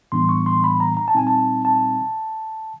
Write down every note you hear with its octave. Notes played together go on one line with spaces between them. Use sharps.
A2 E3 G3 B3 D4 C6
C#6
C6
B5
A#5
A#5
A5
A#2 G3 C4 D#4 G#5
A5
A5